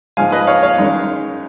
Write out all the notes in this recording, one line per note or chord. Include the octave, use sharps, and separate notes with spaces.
G#2 F3 G#3 F5 G#5
B4 D#5
C#5 F5
C#5 F5
F#2 D#3 G#3